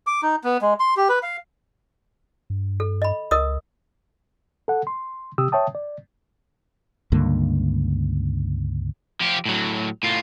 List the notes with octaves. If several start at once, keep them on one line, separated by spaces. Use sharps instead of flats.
D6
D#4
B3
G#3
C6
G4
B4
F5
G2
A4
D#5 B5
C#2 A#4 D#5 D#6
A4 F#5
C6
C3 G4 D#6 E6
C#5 E5 G5 A5 D#6
D5
C#2 G2 D3 A#3
F3 G4
A2 F#3
A2 F4